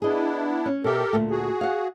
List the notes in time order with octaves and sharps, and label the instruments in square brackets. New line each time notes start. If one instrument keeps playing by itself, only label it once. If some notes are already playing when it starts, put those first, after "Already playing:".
[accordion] B3 D4 E4 [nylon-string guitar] G#4 D#5
[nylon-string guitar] C#4
[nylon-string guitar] B2 E5 [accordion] G4 A4 A#4
[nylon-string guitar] D2 A#2 A3
[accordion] F#4 G#4
[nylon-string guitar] F5 F#5